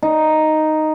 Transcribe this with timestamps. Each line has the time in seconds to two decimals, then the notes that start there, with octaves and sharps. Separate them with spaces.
0.02 D#4